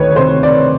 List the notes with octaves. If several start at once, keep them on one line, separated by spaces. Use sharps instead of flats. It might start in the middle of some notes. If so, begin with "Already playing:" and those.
Already playing: D2 D#3 B4 C#5
C3 C5
D5